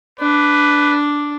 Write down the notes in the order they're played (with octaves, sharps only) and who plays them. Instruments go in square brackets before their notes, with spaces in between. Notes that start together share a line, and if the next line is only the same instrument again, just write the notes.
[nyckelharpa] D4 [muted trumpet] B4